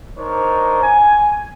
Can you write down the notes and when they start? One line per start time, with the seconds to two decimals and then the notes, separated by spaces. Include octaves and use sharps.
0.18 D4 D#4 A#4 C5 C#5
0.83 G#5